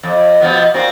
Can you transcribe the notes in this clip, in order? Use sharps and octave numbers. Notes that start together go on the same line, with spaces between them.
F2
B2 F3 B3
A#2 C4 F#4